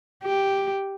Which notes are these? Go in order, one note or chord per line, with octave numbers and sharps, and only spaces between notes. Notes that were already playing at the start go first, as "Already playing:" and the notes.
G4